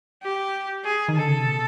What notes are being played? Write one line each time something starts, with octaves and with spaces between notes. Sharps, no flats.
G4
G#4
D#3
D3 A4
C#3
C3
B2